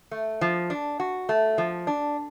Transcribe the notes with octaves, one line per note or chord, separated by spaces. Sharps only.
A3
F3
D4
F#4
A3
F3
D4